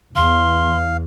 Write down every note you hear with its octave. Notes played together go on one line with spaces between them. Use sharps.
E2 F5 C6